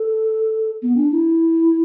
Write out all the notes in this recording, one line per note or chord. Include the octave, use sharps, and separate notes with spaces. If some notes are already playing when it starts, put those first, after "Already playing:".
Already playing: A4
B3
D4
E4